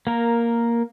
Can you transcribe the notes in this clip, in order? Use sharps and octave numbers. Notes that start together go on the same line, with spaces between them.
A#3 A#4